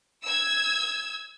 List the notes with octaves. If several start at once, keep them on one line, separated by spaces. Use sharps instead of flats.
E6 G#6